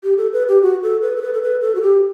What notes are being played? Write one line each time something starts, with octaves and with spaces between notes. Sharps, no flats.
G4
A4
B4
G4
F#4
A4
B4
A4
B4
A4
B4
A4
F#4
G4